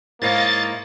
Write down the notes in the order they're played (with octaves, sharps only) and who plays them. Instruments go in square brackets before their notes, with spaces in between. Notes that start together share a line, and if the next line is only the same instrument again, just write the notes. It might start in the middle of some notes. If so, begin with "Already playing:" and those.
[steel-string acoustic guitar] G#2 E4 F5 [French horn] A#3 [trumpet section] C#5 D#5 [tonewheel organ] A6